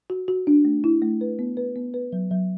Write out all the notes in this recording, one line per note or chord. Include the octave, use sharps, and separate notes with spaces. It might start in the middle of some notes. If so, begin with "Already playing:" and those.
F#4
F#4
D4
A3
E4
A3
B4
B3
B4
B3
B4
F#3
F#3